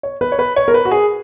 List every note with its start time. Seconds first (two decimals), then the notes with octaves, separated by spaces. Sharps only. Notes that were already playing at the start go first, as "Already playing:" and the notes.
0.03 C#5
0.21 B4
0.32 C#5
0.39 B4
0.56 C#5
0.68 A#4
0.74 B4
0.85 F#4
0.91 G#4